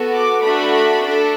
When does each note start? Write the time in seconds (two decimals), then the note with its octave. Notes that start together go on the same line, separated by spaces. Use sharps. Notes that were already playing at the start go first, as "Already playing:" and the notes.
Already playing: B3 F#4 A4
0.15 D6
0.43 A3 D4 F#4 A4 B5
0.99 D4 A4